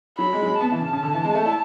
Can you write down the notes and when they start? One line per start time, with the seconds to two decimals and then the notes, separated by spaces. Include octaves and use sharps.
0.18 F#3 B5
0.33 G#3
0.42 F#3
0.46 G#3
0.60 B3 A5
0.72 E3
0.81 C#3
0.93 C#3
1.03 D3
1.14 E3
1.24 G#3
1.35 A3
1.46 E4